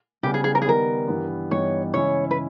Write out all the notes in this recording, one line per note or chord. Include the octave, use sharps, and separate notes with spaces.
C#3 G3 B3 G4
G#4
G#4
A#4
G#4
D#3 G3 B3 D#4 A#4
G2 E3 G3 B3
G2 E3 G3 B3 D#4 C#5
C#3 E3 G#3 C#4 E4 C#5
B4